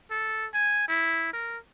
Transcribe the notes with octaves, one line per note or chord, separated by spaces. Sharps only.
A4
G#5
E4
A#4